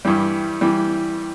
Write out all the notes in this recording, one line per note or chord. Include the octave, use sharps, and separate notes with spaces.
G2 E3 G3
E3 G3